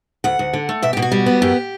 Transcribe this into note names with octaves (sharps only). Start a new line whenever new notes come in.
D2 F#5
D2
D3
A3
B2 E5
B2 G4
F#4
G3
B3
F#2 G4